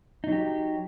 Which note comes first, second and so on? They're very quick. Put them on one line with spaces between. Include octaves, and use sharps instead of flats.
D#4 F#3 G4